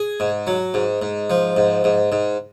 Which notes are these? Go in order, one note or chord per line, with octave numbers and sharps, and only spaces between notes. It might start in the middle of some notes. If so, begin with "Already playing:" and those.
Already playing: G#4
G#2
F#3
G#2
G#2
F3
G#2
G#2
G#2